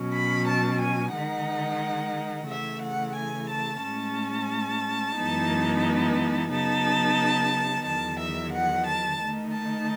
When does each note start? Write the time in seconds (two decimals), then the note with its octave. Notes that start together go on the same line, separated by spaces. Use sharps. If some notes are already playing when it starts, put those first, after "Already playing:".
Already playing: B2 F#3 C#4
0.14 B5
0.47 A5
0.81 G#5
1.14 D#3 G#3 D#4 F#5
2.48 C#3 E3 A3 E5
2.81 F#5
3.16 G#5
3.50 A5
3.83 A2 G#3 C#4 A5
5.16 F#2 E3 G#3 B3 D#4
6.51 C#3 F#3 B3 D#4 A5
7.85 E2 D#3 F#3 A5
8.19 E5
8.52 F#5
8.86 A5
9.20 D#3 A3 D#4
9.53 A5